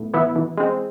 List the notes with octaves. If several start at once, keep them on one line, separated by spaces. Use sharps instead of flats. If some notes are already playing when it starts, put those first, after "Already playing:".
Already playing: A2 B3
E3 B3 E4
E3
G#3 C4